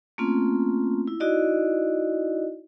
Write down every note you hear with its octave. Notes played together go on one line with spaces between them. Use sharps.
A3 A#3 C4 C#4 F4
E4
D#4 E4 F#4 D5 D#5